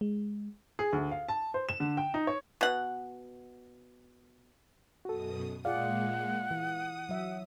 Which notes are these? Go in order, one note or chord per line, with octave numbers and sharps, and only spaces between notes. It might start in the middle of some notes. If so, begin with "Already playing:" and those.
G#3
G#4
D2
F5
A5
C5
E7
D3
G5
D#4
C#5
B2 F#5
F#2 B2 F#4 A4 D#6
A#2 G#3 F4 G#4 D5 F5 F#5
E3 D#6
F#3 E5